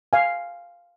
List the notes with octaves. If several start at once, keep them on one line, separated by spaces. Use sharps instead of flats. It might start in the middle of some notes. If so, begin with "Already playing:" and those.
F5 G#5